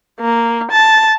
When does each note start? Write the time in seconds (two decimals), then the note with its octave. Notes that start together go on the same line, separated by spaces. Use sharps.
0.20 A#3
0.71 A5